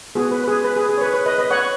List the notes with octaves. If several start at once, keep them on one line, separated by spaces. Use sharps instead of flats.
B3 F#4 G#4
B4
B4
G#4
B4
G#4
G#4
C#5
B4
B4
B4 D#5
B4 D#5
C#5 F#5